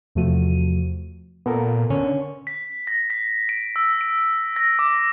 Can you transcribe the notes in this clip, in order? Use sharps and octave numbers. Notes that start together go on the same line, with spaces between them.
E2 C3 F3 A3 F#4 D#7
A#2 B3 A4 A#4
D3 C#4
B6
A#6
B6
D7
E6
D7
A#6
D6